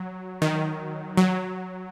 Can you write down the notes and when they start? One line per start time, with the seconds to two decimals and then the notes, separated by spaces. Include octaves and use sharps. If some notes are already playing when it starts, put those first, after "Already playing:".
Already playing: F#3
0.42 D#3
1.17 F#3